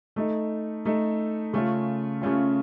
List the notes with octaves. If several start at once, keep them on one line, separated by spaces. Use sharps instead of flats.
A3 D#4 A4
A3 D#4 A4
C#3 A3 C#4 F4
C#3 A3 C#4 F4